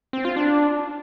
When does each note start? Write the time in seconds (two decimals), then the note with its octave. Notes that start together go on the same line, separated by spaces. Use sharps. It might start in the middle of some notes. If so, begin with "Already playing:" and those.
0.13 C4
0.25 F4
0.36 D4